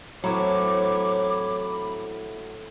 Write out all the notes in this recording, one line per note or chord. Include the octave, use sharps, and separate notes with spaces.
A2 E3 F#3 C4 C#5 B5 D6